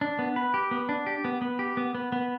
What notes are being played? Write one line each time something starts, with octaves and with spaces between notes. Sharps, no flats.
D4
B3
B4
G4
B3
D4
G4
B3
B3
G4
B3
B3
B3